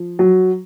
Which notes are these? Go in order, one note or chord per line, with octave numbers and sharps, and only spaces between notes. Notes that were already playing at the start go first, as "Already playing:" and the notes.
Already playing: F3
F#3